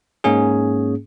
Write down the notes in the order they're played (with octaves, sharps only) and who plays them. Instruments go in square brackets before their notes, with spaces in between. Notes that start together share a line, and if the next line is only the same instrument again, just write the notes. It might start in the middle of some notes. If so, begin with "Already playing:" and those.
[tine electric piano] G#2 A#3 C#4 G#4